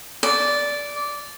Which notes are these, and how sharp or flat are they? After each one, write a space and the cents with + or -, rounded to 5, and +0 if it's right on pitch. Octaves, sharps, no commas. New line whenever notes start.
D5 -10